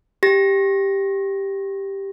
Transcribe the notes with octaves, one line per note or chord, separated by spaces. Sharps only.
G4 A#6